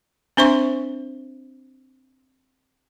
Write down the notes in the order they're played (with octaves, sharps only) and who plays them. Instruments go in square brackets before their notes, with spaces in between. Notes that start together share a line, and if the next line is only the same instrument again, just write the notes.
[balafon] C4 D4 C5 E5 C6 C#6